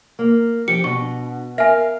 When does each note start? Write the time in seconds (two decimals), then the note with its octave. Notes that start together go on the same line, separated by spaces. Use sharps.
0.19 A#3
0.68 F3 G4 C#7
0.84 B2 D4 C#6
1.58 A#4 E5 F5 G#5